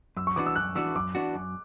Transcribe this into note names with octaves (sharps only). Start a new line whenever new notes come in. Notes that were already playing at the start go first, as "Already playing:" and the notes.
F#2 E6
C#6
E3 B3 D4 F#4 D6
E6
F#2 F#6
E3 B3 D4 F#4 E6
F#2 D6
E3 B3 D4 F#4
F#2